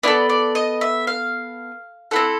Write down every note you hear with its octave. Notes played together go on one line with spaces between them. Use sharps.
B3 E4 A4 D5
D5
D#5
E5
F5
C4 E4 A4 F#5